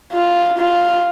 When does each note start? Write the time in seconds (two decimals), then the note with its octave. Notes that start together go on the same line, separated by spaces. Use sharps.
0.13 F4
0.58 F4